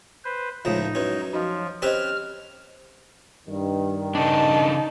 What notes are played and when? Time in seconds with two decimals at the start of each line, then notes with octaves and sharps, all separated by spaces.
0.25 B4 C5
0.65 C#2 A2 F3 D#4
0.95 F#2 C#4 E4 B4
1.33 F3 D#4 F#4 D#5
1.82 C4 C#4 G4 B4 C5 D#5 F6
3.47 G2 D#3
4.15 C#3 D4 D#4 A5